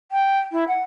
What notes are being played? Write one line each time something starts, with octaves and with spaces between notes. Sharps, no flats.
G5
E4
F#5